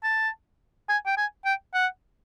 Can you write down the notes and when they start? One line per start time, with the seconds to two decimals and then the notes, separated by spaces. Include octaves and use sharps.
0.03 A5
0.89 G#5
1.06 G5
1.17 G#5
1.45 G5
1.74 F#5